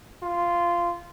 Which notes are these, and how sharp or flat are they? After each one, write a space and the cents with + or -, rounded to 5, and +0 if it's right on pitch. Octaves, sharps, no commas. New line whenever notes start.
F4 -10